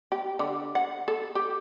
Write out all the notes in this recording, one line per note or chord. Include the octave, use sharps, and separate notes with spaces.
G4
D3
F#5
A4
G4